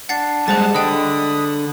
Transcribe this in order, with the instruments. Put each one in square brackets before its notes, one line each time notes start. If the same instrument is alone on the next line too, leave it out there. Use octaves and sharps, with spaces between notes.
[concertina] D4 [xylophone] F#5 A6 C7
[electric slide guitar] G3 G#3 [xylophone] G#4 C5 A6 [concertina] F#5 A5
[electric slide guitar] D3 [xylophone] D#5 G5 [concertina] B5 D#6